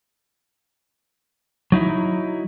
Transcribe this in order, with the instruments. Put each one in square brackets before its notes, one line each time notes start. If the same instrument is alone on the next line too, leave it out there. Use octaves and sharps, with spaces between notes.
[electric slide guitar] F#3 D#4 E4